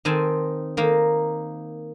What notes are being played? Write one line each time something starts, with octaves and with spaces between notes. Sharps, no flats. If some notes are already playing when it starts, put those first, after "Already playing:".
D#3 C4 G#5 A5
D#3 A#3